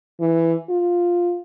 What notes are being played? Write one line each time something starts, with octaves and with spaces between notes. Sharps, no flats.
E3
F4